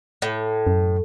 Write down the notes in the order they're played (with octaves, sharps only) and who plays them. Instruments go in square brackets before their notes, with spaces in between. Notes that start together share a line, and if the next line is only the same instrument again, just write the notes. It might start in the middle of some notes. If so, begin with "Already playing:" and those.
[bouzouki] A2
[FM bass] F#2